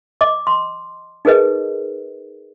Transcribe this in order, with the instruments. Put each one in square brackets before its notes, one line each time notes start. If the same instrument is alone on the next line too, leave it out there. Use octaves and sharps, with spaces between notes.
[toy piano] D#5 D6
C6
D#4 G#4 A#4 B4 D#5